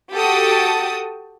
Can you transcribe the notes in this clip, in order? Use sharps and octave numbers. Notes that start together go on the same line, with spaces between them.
F#4 G4 A4 G5 A5 D#6